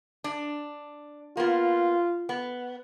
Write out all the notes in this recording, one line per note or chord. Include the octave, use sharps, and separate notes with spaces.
D4
A#3 B3 F4
B3